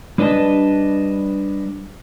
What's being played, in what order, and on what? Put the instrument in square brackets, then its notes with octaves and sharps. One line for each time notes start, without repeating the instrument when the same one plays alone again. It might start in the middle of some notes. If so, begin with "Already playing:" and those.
[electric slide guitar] G3 D4 B4 D#5 A5